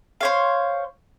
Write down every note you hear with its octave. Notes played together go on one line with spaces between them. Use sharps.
C5 C#5 F5